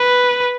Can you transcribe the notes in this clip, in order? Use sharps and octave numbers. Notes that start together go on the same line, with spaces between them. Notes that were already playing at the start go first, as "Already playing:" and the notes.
Already playing: B4